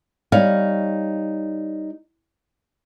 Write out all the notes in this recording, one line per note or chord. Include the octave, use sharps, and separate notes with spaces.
G3 D#4 C#5 F5